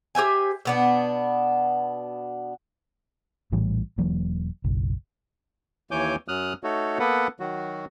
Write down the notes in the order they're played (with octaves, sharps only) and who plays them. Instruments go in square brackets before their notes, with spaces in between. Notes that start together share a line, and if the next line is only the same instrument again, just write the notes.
[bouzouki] G4 C5 E5 G#5
B2 B3 D4
[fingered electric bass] A#1 A2 E3 G3
E1 E3 F#3 A#3
F#1 B1
[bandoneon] D#2 E3 C#5 G#5 D6 G6
F#2 F#3 D#6 F6 F#6
A3 D#4 F#4 A4 C#5
A#3 B3 A4 B4 F#5
D#3 F#3 F#4